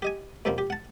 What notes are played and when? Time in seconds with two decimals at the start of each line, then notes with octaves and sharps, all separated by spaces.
0.02 G4 D#5 G#5
0.45 D#2 B2 F3 F#3 A#3 C4
0.58 G4
0.70 F#5 A5